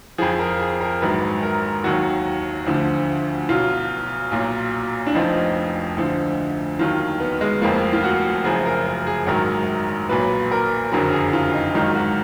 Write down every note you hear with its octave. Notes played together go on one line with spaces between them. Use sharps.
F2 F3 G#4
A#4
G#4
A#4
A#1 G#2 D#3 F#3 B4
A#4
D#2 D#3 F#3 F#4
D2 D3 F3
B1 B2 F#3 F4
B1 A#2 F#3
D4
F1 F2 F3 D#4
D2 D3 F3
D#2 D#3 F#3 F4
B3
G#3
F1 F2 F3 A#3
F4
F#4
F#1 F#2 F3 G#4
A#4
A#4
G#4
A#1 G#2 D#3 F#3 A#4
B1 A#2 F#3 B4
A#4
F#1 F2 D3 F#3 A#4
G#4
F4
D#4
G#1 G#2 D#3 F#3 F4
F#4